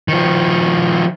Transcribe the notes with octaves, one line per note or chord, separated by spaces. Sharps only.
D#3 F3